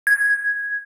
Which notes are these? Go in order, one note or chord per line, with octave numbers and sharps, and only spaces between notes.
G#6